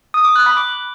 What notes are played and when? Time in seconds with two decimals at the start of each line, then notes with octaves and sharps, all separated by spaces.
0.14 D#6
0.25 D6
0.36 F#6
0.46 B5
0.57 D6